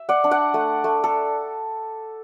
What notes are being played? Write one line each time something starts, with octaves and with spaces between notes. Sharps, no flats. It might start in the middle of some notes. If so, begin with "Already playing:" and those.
Already playing: E5
D5 F#5
D4
D5 F#5
A3
A3
A4